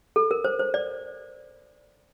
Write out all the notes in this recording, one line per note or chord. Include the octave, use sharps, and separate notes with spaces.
A4
A#4
C5
C5
D5